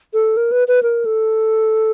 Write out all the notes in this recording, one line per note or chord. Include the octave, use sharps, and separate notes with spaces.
A4
A#4
B4
B4
A#4
A4